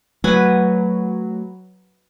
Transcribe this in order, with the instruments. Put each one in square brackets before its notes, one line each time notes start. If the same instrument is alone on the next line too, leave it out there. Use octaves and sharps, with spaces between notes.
[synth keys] F#3 [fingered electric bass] A3 [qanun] B4 F#5 G#5